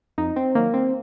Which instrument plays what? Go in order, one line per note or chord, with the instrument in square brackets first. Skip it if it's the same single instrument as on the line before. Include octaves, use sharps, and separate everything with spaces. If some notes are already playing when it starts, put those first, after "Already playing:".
[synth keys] F2 D#4
C4
D#3 F#3 A#3
C4